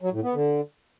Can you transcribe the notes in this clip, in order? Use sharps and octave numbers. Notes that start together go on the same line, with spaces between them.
F#3
A2
B3
D3